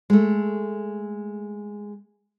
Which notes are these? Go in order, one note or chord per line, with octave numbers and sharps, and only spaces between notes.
G#3 A3